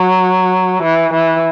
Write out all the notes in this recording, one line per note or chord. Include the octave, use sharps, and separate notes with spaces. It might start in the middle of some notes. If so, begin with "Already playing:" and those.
Already playing: F#3
E3
E3